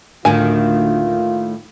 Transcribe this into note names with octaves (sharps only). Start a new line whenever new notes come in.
D2 A2 D#3 A#3 F4 G#5